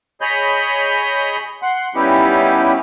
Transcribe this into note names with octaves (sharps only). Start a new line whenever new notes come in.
G#4 C#5 D#5 B5 G6
F#5 C6
G3 B3 C#4 D#4 E4 G4